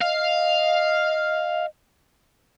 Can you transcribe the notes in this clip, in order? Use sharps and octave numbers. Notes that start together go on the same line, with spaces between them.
D#5 F5